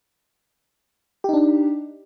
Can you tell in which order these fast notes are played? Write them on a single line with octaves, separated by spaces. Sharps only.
G4 D#4 D4